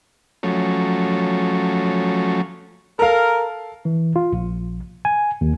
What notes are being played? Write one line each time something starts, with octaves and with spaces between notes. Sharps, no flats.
F3 F#3 A3 C#4
A4 A#4 F5
E3
F4
A#1
G#5
D#2